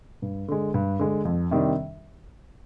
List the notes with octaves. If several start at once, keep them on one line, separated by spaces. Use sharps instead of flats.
G2
D3 G#3
G2
D3 G#3
F2
C3 D#3 G3 D4